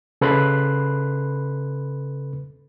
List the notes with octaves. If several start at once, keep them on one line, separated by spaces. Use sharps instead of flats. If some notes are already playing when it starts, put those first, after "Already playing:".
C#3 A4 B4 B5 C6 F#6